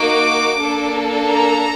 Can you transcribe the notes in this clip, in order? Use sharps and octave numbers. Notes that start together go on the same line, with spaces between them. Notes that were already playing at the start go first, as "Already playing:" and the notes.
Already playing: A#3 D#4 F#4 D6
A#3 D4 A4
A#5